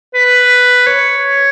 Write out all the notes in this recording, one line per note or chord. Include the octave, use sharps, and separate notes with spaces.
B4
C#5